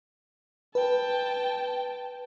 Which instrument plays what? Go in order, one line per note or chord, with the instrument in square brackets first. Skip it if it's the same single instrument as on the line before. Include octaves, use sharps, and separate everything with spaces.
[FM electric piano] B4 [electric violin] G5 A5